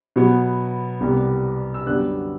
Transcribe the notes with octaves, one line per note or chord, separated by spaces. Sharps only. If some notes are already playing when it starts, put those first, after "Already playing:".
B2 F#3 B3
C2 C3 G3 B3
E6
F#2 D3 G3 B3 F#6